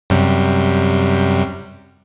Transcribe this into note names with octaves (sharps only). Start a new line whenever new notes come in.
F#2 C3 G3